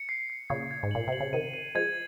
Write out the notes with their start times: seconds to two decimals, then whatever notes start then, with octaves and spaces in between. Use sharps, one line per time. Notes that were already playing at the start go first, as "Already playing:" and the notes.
Already playing: C#7
0.09 C7
0.30 C7
0.50 A#2 C#3 G#6
0.71 G#6
0.83 G#2
0.91 A#2 F#7
1.07 C3 F#7
1.21 C#3
1.33 C3 D#3 D#7
1.54 D#7
1.75 F3 G#3 G#6